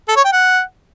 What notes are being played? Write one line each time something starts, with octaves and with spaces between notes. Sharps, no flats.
A4
C#5
G5
F#5